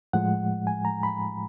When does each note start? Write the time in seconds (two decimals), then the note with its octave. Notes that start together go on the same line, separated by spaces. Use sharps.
0.13 A2 F3 G#3 F#5
0.67 G#5
0.85 A#5
1.03 B5